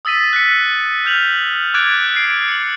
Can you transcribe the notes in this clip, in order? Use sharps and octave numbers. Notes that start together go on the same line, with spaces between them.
D#6 E6 A6 B6 D#7
F#6 B6 C#7
F6 G6 F7 F#7
D6 F#6 G#6 A6 D7
C7 D7
C#7 F#7